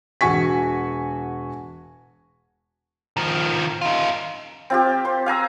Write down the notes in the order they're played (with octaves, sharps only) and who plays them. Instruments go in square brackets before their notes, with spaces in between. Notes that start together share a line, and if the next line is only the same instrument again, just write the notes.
[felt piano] E1 F#4 G#5 C#6 B6
[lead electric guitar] D#3 F3
D#4 F4
[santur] C4 F4 G4
C5
F5 G#5 A#5 E6